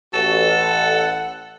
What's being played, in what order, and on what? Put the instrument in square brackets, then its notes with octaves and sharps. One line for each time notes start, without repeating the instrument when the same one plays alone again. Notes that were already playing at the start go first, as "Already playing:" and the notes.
[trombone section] A1 [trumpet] F#4 [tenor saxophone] A4
[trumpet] F#5